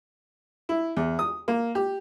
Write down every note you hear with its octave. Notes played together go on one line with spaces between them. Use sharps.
E4
E2
D#6
A#3
G4